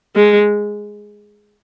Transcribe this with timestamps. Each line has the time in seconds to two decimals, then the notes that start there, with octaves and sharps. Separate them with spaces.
0.16 G#3